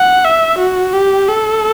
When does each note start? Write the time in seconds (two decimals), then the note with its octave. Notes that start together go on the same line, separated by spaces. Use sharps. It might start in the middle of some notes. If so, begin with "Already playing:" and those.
Already playing: F#5
0.24 E5
0.58 F#4
0.93 G4
1.28 A4